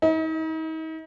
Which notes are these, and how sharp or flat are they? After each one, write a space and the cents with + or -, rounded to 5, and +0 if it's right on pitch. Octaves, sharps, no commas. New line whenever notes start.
D#4 +40